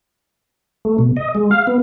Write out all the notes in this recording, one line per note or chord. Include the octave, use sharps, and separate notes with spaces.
A3
B2
D#5
G#3
F5
B3